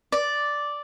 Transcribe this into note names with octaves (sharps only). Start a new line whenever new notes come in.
D5